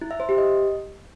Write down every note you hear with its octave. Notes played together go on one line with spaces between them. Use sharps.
E4
E5
C5
G4
D#5